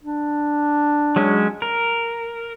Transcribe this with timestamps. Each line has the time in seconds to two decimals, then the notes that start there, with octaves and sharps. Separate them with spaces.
0.04 D4
1.16 F#3 G#3 C#4
1.62 A#4